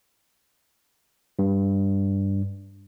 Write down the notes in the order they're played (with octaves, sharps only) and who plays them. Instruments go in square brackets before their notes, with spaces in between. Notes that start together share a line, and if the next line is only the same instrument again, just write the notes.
[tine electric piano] G2